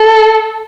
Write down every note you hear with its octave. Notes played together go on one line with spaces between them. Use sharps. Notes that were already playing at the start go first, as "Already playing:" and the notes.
Already playing: A4